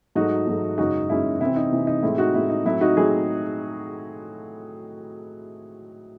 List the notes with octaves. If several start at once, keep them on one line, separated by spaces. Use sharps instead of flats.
G#2 F#3 A3 D#4 F#4
G#2 F#3 A3
F#2 C#3 G#3 C#4 D#4 F#4
F#2 C#3 G#3 C#4 E4
C3 E3 C4 E4
D#4
C3 E3 C4
D#4
A2 G#3 C4 E4
D#4 F#4
A2 G#3 C4 E4
D#4
A2 F#3 C4 E4
D#4 F#4
A2 F#3 C4 E4 G#4